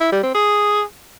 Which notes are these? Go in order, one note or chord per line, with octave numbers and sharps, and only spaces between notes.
E4
G3
C4
G#4